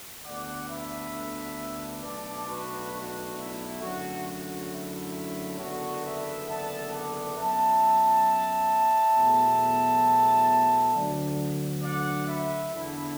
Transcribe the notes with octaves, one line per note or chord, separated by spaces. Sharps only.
D2 D3 B3 D4 D5 F#5
B4 E5
B1 B2 A3 D4 A4 D5
F#4 B4
F#4
E4
F#2 D3 F#3 A3 F#4
F#4
E4
F#1 E2 D3 B3 D4 F#4
B4 E5
E5 A5
D5 F#5
F#2 F#3 B3 E5 A5
E2 B2 F#3 A3
D2 D3 F#3 D5 F#5
D5 F#5
B4 E5
E2 D3 B3 E4